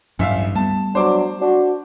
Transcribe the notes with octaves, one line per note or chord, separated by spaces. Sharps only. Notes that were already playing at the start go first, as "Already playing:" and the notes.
A1 G2 F#3 D4 E5 F5
G3 A3 B3 A5
F#3 D4 C5 D6
D4 F#4